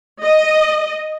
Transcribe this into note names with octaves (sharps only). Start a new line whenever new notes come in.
D#5